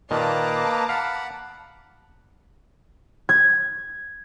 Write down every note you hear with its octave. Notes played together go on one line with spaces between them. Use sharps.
A#2 D#3 A#3 B4 D#5 A5 A#5 D6
F5 F#5 B5
G#6